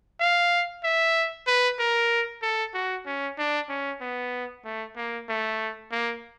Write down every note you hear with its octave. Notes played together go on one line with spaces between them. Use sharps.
F5
E5
B4
A#4
A4
F#4
C#4
D4
C#4
B3
A3
A#3
A3
A#3